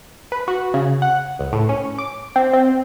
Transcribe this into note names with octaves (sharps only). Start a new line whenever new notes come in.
B4
F#4
C#3
F#5
C#2
A2
C#4
D6
C4
C4